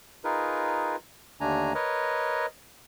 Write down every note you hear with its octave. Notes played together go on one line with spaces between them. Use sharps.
D#4 F4 G#4 A#4 B4
D#2 D3 A3 D4 G#5 A#5
A#4 B4 C#5 D#5